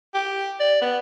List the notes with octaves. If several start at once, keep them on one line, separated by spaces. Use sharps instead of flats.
G4
D5
B3